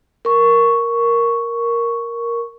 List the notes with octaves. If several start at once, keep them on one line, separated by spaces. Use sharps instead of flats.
A#4 C#6